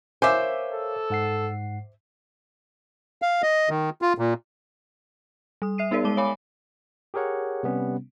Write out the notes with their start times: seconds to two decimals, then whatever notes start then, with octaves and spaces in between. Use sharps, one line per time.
0.22 A#4 C5 C#5 E5 F5 G#5 D6
0.74 A4
1.10 G#2 F#5 C7
3.22 F5
3.42 D#5
3.69 D#3
4.02 F4
4.18 A#2
5.62 G3 D#6
5.78 E5 C7 D#7
5.91 B3 D#4 G#4 A#4 D5
6.04 G#3 D6 G7
6.17 C#5 F5 G#5 B5 D6
7.14 G4 G#4 A#4 C#5 F#5
7.63 C3 G3 B3 C#4